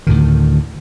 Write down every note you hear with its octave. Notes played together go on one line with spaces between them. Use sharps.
D2 A2 D#3